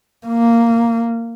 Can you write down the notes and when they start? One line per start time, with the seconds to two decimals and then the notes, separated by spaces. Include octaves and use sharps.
0.27 A#3